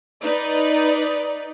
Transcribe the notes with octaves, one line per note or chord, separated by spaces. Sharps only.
D#4 B4 D5